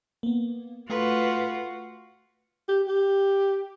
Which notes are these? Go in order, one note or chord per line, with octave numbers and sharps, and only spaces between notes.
A#3 B3
A3 F4 F#4 B4
G4
G4